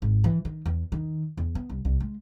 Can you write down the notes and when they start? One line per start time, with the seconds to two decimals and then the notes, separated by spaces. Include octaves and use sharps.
0.02 G#1
0.24 E3
0.45 D#3
0.66 E2
0.92 D#3
1.37 E2
1.55 B3
1.69 C2
1.85 C2
2.00 G#3